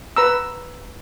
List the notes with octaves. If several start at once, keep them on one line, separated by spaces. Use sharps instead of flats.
B4 A#5 E6